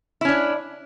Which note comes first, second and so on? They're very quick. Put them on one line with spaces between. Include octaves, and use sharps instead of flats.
E4 C#4 D4